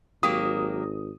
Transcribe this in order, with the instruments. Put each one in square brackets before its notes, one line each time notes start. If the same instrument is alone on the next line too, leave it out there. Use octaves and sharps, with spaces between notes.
[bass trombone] G#1 [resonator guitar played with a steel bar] F#3 A#3 G4 [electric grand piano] D#6